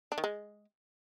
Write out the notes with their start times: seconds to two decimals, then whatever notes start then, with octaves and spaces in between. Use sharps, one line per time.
0.12 D4
0.18 D#3
0.24 G#3